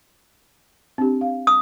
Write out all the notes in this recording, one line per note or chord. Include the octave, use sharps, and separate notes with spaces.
C4 D4 G4
F5
D#6